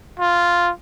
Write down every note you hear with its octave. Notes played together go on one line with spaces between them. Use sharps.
F4